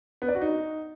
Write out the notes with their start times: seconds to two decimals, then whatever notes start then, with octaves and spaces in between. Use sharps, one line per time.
0.22 B3
0.28 D5
0.35 F#4
0.41 D#4